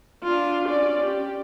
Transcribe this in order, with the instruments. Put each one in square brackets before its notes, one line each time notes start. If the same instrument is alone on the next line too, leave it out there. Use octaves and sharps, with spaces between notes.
[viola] D4 F4
C#4 D5
G4